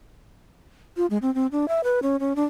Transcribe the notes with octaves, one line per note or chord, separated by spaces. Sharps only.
F4
G#3
C4
C4
D4
E5
B4
C#4
C#4
D4